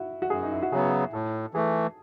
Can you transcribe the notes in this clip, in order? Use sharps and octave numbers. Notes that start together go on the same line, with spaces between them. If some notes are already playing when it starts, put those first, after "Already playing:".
Already playing: E4 F#4
F#4
F#2 G#4
D#4
E4
F#4
C#3 F#3 B3 G#4
A2 A4
E3 A3 G#4